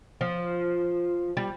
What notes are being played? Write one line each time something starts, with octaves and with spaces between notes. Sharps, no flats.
F3
G3